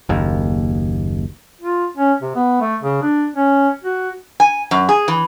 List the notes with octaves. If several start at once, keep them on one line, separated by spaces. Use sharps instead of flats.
F#1 D#2
F4
C#4
C3
B3
A3
C#3
D4
C#4
F#4
G#5
F#2
G#4
E3